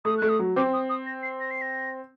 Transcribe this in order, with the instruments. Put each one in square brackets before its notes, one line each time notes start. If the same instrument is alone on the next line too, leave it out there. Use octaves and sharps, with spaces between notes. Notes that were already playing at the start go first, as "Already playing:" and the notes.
[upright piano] A3 [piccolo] D#6
[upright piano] A3 [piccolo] F#6
[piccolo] D#6
[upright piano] F#3
[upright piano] C4 [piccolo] D6
[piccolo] D#6
D#6
A#6
C7
A#6
C7
A#6